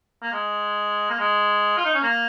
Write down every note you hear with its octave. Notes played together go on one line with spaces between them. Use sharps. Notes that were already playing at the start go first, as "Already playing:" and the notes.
A#3
G#3
A#3
G#3
F4
D#4
C#4
A#3